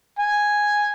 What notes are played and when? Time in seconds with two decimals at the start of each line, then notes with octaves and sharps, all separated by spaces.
0.19 G#5